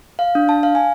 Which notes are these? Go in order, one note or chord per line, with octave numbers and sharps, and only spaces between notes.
F5
D4
A5
F5
G#5